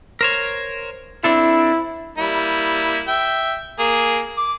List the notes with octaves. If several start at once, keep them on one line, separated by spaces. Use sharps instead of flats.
A#4 C5 C#5
C4 D4 E4 A4
G3 A#3 E4
E5 G5
A#3 G#4
D6